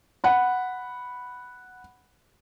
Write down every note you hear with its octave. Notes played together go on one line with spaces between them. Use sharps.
F#5 B5